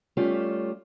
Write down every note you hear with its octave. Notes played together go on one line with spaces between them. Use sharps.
G3 A3 C#4 F4